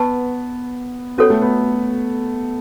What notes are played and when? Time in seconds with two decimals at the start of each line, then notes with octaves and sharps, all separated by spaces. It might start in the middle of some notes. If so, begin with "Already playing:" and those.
Already playing: B3 B4 F#5 A5 C#6
1.18 B3 C#4 F#4 A4 C#5
1.30 A3
1.42 B3